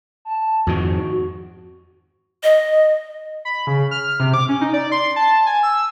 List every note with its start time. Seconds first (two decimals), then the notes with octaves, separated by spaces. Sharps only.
0.25 A5
0.67 F2 G#2 D#3 F#4
2.44 D#5
3.45 B5
3.67 C#3
3.91 F6
4.20 C3
4.34 D6
4.49 C#4
4.61 D#4
4.73 D5
4.92 C6
5.16 A5
5.46 G#5
5.63 E6